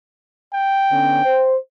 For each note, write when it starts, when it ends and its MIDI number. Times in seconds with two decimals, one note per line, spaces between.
0.53 1.52 79
0.91 1.22 50
0.91 1.22 59
0.91 1.22 61
1.24 1.56 72